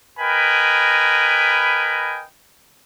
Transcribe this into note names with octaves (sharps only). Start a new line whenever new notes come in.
A#4 B4 D#5 G5 G#5 B5